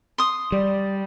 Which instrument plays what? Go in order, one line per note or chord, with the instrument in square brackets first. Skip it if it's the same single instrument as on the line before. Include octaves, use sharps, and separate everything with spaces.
[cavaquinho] C6 D#6
[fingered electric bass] G3 [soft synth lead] D5